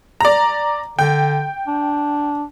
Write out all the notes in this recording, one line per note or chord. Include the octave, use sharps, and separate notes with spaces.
D5 A#5
D3 G5
D4